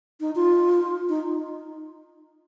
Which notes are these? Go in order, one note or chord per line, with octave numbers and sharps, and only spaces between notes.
D#4
F4
D#4